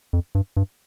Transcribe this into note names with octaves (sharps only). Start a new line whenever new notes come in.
F2
G2
G2